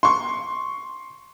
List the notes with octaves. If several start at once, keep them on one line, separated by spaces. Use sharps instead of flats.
C6 C#6